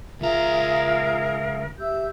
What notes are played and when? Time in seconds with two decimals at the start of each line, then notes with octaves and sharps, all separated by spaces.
0.21 C#2 F4 G#4 A#4 E5 F5 A#5
1.79 G4 E5 E6 G6